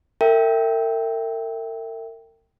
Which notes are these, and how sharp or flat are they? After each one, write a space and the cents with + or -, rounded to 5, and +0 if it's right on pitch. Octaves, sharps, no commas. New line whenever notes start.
A#4 -40 E5 +0 G5 +0